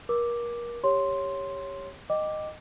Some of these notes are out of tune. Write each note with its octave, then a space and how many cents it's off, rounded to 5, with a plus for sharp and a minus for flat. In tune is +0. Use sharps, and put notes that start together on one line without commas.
A#4 +30 D6 +0
G4 +10 C#5 -5 C6 +0
D#5 -10 G5 -5 D6 +0